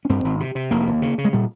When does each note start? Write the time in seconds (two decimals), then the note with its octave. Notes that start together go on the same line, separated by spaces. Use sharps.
0.05 C#4
0.10 G2 C4
0.24 G#1
0.40 C3
0.55 C3
0.71 F1 A#3
0.87 D#2
1.02 C#3
1.18 C#3
1.25 G#3
1.33 A#2 G3